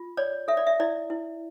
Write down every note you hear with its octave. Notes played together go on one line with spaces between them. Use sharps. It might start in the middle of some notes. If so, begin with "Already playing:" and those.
Already playing: F4
C#5 D5
A4 E5
D5
E5
E4 D5
E4